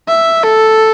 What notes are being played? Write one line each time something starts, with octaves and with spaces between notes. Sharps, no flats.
E5
A4